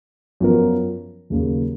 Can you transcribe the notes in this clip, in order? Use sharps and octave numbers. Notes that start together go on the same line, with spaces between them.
F#2 F3 B3 F4 A#4
D#2 C#3 F#3 A#3